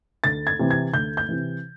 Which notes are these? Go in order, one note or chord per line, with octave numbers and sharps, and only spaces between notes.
D2 A6
G#6
C3 E3
G#6
D2 G6
G6
C3 E3